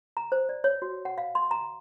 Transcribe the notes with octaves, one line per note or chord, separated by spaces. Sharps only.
A#5
C5
D5
C#5
F#4
F#5
F5
C6
A#5